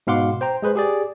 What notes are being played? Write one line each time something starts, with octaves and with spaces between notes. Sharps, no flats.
G#2 B2 F5 F#5 C6 D6
C5 G5 A#5
G#3 G#4 B4 C5
G4 G#4 D5